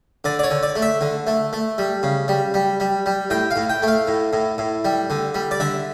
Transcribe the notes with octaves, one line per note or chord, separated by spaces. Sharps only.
D3 D5
D5
C#5
D3
D5
A3
E5
D3
A3
A3
G3
C#3
G3
G3
G3
G3
A2 G5
F5
A2
G5
A3
F5
A2
A2
A2
G3
D3
G3
D5
D3 E5